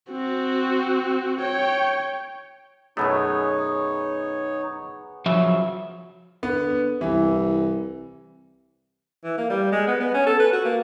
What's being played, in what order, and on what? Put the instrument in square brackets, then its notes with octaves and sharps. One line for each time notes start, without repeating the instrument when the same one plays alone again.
[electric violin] C4 F#4
C#5 G5
[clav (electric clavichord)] F#2 B2 A3 [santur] B3 G#4 [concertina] D#4 C#5
[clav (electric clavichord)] C#3 [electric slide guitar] F3 F#3 E5
[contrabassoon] D3 [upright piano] B3
[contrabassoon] C2 [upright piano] E3
[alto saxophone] E3
A#3
G3
G#3
B3
B3
C#4
A4
B4
F#4
A#3